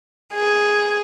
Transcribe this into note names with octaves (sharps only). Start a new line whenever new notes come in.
G#4